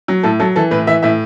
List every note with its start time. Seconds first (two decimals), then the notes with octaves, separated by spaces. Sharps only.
0.08 F#3
0.23 A2 A4
0.40 F#3 A4
0.56 E3 A4
0.71 A2 B4
0.87 E3 E5
1.02 A2 E5